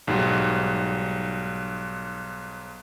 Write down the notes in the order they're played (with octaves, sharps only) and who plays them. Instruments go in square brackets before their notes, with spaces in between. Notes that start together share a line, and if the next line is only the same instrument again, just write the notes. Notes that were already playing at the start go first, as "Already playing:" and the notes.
[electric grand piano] B1 G#2 F#3 G3